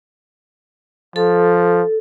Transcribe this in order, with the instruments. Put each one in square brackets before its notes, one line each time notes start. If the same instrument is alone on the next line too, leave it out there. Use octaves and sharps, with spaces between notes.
[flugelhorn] F3 [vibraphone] A4